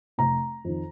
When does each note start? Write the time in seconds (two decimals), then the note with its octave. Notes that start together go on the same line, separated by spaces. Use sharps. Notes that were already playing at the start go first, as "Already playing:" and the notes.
0.18 F1 A#5
0.64 F2 D#3